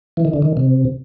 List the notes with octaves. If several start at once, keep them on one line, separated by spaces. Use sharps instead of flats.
E3
D#3
D3
D#3
C3